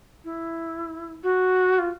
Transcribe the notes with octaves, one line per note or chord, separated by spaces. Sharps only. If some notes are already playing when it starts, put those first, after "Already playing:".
E4
F#4
F4